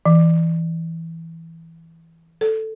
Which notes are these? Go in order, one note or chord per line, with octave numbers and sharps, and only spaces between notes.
E3
A4